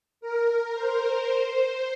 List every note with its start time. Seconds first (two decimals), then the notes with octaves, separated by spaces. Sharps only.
0.21 A#4
0.74 C5
1.27 C5